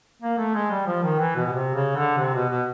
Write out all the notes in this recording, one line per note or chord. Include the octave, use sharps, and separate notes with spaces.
A#3
A3
G#3
G3
F3
D#3
E3
B2
B2
C3
C#3
D3
C3
B2
B2